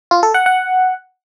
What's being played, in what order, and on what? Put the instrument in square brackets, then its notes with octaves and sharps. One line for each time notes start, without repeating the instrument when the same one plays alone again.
[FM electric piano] F4
A4
F#5
F#5